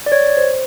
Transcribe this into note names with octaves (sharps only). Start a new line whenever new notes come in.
D5
C#5
C5